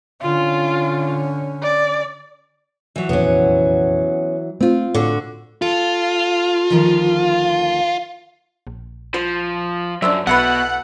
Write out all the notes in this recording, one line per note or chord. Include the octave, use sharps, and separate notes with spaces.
D3 C#4 F4
D5
E3 F#3
F1 A#1 E2 B3 C#4
A3 C4 F4
A2 D3 F#4
F4 A4
D2 D#3 F3
A#1
F3 C5
F#2 F#3 D4 C5 E5
B1 B2 A3 E4 B4 F#5